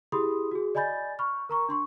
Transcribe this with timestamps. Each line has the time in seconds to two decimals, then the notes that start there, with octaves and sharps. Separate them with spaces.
0.12 E4 G4 G#4 B5 C6 D#6
0.51 F#4 G#4
0.75 D5 D#5 G#5 B5 G6 A6
1.19 B5 C#6 F6
1.49 A#4 A#5 C#6
1.69 D4 C6 C#6